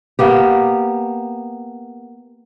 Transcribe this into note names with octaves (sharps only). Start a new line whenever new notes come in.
A#3 B3 G4